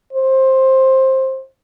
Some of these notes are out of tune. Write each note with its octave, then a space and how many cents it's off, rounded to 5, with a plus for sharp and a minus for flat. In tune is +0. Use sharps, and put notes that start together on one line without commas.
C5 +15